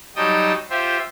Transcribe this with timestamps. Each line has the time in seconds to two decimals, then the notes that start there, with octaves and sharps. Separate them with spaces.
0.16 F#3 G3 D#4 G5 A5 D#6
0.70 F4 G4 C5 E5